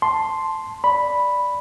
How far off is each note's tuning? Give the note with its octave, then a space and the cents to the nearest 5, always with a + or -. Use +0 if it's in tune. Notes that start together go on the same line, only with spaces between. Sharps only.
A5 +0 C6 +0
D5 +0 B5 +0